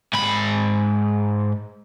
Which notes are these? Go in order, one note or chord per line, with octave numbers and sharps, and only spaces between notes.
G#2 B5